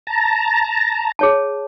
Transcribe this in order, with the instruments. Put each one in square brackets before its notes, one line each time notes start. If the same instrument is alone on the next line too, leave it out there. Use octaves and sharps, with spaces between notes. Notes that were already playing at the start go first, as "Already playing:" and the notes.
[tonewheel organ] A5 A#5
[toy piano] G#4 C#5 A5